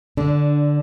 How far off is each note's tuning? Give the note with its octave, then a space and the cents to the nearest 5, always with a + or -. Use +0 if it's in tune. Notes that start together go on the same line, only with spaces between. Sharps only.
D3 +0 D4 -15